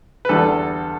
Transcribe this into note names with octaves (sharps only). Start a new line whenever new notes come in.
B4
E2 D3 G3 A4